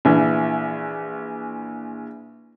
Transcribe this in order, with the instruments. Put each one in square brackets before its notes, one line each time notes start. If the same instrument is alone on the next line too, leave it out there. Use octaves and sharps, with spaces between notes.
[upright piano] A#1 E3